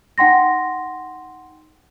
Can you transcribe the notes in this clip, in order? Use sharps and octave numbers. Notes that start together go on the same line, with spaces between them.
D#4 F#5 G5 C6 A#6